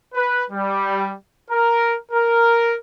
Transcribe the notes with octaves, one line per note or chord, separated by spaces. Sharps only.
B4
G3
A#4
A#4